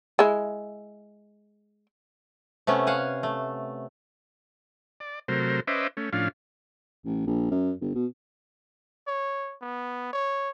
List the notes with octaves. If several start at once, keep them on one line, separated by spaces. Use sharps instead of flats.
G#3 E4
C3 A3 B3 C#4
F5 F#5 G#5
A3
D5
C3 F#3 A3 A#4 C5
C#4 B4 C5 D#5 E5 D6
A3 C#4
A2 F3 C#4 D4 F5
A1
A#1
F#2
G1
B2
C#5
B3
C#5